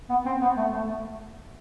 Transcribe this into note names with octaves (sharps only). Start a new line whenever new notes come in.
B3
C4
B3
A3
A3